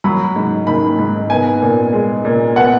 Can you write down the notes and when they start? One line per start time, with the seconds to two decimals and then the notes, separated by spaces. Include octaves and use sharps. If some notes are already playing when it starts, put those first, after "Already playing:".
0.04 F#3 B5
0.36 G#2
0.67 D#3 B5
0.99 G#2
1.30 B3 G#5
1.62 A#2
1.93 G#3
2.25 A#2
2.56 B3 F#5